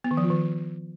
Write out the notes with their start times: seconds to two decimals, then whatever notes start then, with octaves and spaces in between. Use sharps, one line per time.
0.04 B3
0.11 D#3
0.17 F3
0.24 F4
0.30 D#3